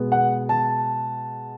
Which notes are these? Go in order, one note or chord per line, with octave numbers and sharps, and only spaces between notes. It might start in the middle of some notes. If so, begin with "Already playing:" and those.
Already playing: B2 G#3 B3
F#5
A5